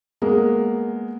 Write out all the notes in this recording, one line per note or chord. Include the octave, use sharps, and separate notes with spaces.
G#3 A#3 B3